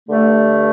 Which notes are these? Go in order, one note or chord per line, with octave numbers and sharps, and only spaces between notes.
G2 D3 A3